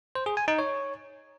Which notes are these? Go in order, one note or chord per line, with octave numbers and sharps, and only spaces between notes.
C5
G#4
G#5
D#4
C#5